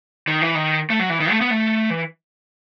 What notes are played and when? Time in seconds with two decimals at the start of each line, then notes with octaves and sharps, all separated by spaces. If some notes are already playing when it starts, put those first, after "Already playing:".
0.27 D#3
0.42 E3
0.55 D#3
0.90 A3
1.00 F#3
1.10 E3
1.20 D#3
1.30 A3
1.41 B3
1.50 A3
1.90 E3